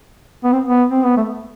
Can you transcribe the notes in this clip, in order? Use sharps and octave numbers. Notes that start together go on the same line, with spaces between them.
B3
C4
B3
C4
B3
A3